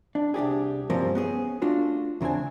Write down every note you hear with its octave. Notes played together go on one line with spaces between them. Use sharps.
D4
C2 D4 G4 G#4
G2 F3 G3 A#3 C4 C#4
B3 C#4 G#4
A3 D4 F4 F#4
E2 C#3 C4 D4 G#5